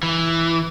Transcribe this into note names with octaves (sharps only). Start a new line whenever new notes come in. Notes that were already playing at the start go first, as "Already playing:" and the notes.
E3